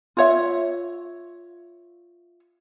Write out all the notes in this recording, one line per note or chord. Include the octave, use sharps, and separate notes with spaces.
F4 C#5 E5